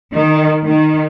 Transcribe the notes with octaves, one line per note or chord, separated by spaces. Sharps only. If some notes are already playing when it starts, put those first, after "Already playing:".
D#3
D#3